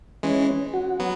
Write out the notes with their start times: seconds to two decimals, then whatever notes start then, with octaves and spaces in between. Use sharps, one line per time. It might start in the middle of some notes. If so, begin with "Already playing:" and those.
0.23 E3 G#3 C#4
0.74 F#4
0.99 F#3 B3